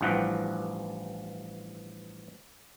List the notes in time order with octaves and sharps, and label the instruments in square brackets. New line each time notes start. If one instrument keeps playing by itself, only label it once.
[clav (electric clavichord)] A1 G2 E3 F3 F#5 G5